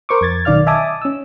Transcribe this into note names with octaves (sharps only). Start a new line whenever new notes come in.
A#4 C5 C#6 D6
F2 G#6 A6
B1 D#3 D5 F5 F6
D#5 E5 G#5 A5 D6 D#6
C#4 E6